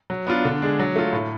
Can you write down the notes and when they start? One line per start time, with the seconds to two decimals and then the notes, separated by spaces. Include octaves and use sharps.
0.10 F#3
0.27 B3 D4 F4
0.45 D3
0.62 G#3 D4 G#4
0.79 F#3
0.96 A3 F4
1.13 A2